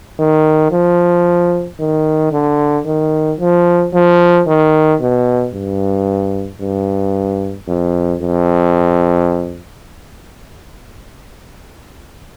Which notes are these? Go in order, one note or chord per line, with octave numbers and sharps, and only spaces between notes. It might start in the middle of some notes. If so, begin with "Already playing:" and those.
D#3
F3
D#3
D3
D#3
F3
F3
D#3
B2
G2
G2
F2
F2